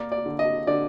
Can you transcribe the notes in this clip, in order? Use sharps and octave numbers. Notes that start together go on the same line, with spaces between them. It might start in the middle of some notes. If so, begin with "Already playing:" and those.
Already playing: A#3 D5
D5
D3
D#5
D3 D5